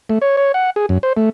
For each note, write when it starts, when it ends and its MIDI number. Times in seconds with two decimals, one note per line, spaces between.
0.09 0.19 57
0.22 0.36 73
0.37 0.52 73
0.54 0.70 78
0.76 0.86 68
0.89 0.98 42
1.03 1.13 72
1.17 1.30 57